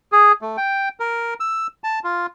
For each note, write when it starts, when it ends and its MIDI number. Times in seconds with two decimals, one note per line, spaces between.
0.12 0.32 68
0.42 0.57 57
0.57 0.89 79
1.00 1.34 70
1.40 1.67 88
1.84 1.99 81
2.04 2.26 65